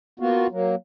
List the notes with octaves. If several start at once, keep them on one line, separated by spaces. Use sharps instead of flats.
A#3 B3 F4 F#4
F#3 A#3